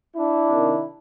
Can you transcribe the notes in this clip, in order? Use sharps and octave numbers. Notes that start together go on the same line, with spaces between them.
D4 E4
C3 D#3